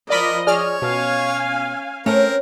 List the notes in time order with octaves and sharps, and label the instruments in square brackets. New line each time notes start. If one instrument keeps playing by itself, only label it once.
[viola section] F3 D#5 [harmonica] A#4 [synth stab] D5 B5
[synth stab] G#4 D5 F6 [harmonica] C#5
[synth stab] B2 [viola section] C#4 F5 G#5
[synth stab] A3 [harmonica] C4 A#4 [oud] C#4